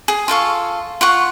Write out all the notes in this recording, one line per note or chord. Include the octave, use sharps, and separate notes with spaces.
G#4
F4 A4 F5 C#6
F4 F#5 C#6